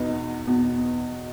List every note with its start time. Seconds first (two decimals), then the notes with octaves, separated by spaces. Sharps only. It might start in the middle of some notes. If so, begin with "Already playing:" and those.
Already playing: E2 B2 B3 D#4
0.47 E2 B2